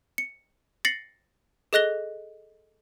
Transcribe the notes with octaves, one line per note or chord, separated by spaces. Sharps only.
C#7
A6 A#6 C7 C#7 F#7
G#4 A4 D#5 F#6 A#6 G7